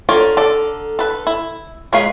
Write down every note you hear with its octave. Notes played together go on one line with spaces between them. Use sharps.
D3 F4 C#5 D5 F5 A#5
A4 D5
A4 B4
E4
G#3 A#4 B4 C#5 F5